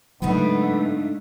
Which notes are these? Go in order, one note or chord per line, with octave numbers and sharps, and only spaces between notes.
G#2 C#3 F#3 A3 B3 D4 D#4 F4